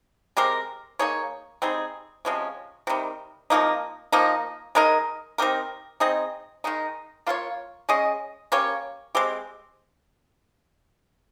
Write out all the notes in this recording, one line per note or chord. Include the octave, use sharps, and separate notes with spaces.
G#3 C4 G4 A#4
A#3 D#4 G#4 C#5
G3 C4 D#4 G#4
C3 F3 G#3 C#4
C3 D#3 G3
C3 F3 A#3 D#4
F3 A#3 D#4
G#3 D#4 A#4 D#5
C4 D#4 G4 A#4
C4 D#4 G#4 D#5
D#3 G#3 D#4
A#3 F4 A#4 C#5
G#3 C#4 G#4 D#5
A#3 C#4 G4 C#5
G#3 C4 G4